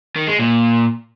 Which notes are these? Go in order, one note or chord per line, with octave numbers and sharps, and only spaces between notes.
D#3
G#3
A#2